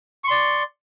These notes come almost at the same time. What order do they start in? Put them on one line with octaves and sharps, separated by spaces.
C#6 C6 D5